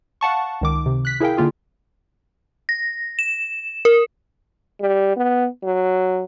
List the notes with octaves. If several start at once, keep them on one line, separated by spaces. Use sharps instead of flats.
F5 F#5 A5 C#6
C#2 D#3 D6
C3
F#6 B6
E4 G#4 A#4 F5 G5
D3 A#3 F4 G#4
A#6
E7
A#4
G3
B3
F#3